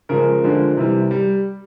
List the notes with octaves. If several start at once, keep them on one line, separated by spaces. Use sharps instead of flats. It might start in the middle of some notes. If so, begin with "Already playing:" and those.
C#3 F3 G#3 A#4
D3 F3 G#3
C3 E3 G3
G3